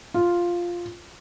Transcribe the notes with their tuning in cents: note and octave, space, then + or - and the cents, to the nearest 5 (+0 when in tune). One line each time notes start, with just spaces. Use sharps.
F4 +0